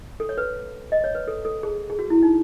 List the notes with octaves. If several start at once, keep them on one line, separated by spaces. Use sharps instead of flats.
A4
C#5
B4
D#5
C#5
B4
A4
A4
G#4
G#4
F#4
E4
D#4